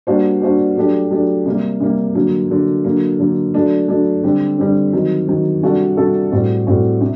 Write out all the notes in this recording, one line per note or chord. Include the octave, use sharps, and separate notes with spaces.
G3 A#3 D4 F#4 C5
G3 A#3 D4 F#4 C5
F#3 A3 D4 G4
F#3 A3 D4 G4
C3 G3 A#3
C3 G3 A#3
D3 F#3 A#3
D3 F#3 A#3
D3 F#3 A#3
D3 F#3 A#3
F#3 A3 D4
F#3 A3 D4
D3 G3 C4 G4
D3 G3 C4 G4
D#3 F#3 C4
D#3 F#3 C4
C3 G3 D4 F#4 A4
C3 G3 D4 F#4 A4
A2 G3 C4 F#4
A2 G3 C4 F#4
C3